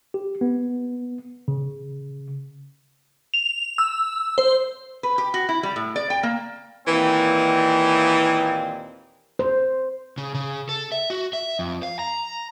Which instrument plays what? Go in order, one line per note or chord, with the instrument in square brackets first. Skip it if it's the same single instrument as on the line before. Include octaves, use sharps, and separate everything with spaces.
[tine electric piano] G4
B3
C#3
[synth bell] F7
E6
C5
[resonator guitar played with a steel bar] B4
G4
F#4
E4
G3
A2
D5
G5
A#3
[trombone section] D#2 A#2 C4 [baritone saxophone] E3
[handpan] C5
[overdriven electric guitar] C#3
C#3
A4
E5
F#4
E5
F2
F5
A#5